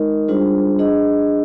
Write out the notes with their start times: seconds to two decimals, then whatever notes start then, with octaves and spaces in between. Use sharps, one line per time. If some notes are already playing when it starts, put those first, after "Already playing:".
Already playing: G#3 D#4 A#4 D#5
0.28 G3 D4 F4 G#4 C5
0.79 D4 G#4 D#5